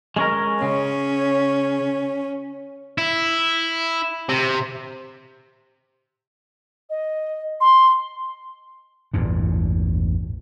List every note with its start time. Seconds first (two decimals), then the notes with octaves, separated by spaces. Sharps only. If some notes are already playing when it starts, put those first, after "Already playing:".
0.16 G#3 C#4 A#4
0.62 C#3 C#4
2.98 E4
4.29 C3
6.90 D#5
7.61 C6
9.14 A1 E2 G2 A#2